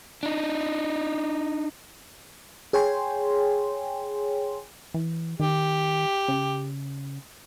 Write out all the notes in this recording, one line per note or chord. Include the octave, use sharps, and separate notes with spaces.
D4 D#4
G#4 C#5 G5 G#5 C6
E3
D#3 G4
C#3